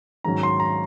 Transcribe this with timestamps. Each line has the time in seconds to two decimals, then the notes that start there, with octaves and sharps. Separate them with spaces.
0.24 G#2 D#3 F#3 C#4 A#5
0.43 C6
0.60 A#5